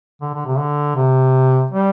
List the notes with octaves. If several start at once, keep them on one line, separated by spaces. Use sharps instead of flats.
D3
D3
C3
D3
C3
G3